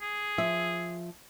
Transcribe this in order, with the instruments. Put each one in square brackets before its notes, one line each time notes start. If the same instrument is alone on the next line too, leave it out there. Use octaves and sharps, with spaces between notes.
[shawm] G#4
[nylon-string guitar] F3 E5